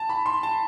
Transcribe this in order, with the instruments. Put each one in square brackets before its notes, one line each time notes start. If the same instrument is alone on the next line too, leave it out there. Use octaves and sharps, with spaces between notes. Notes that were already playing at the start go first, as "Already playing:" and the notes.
Already playing: [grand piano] A5
B5
C6
A5